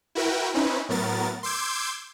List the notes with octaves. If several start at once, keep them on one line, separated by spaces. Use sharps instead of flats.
E4 F#4 A#4 B4 G5
C4 C#4 D#4 E4 B4
A2 F#3 B3 A#4 A6
C6 D6 E6 G6 G#6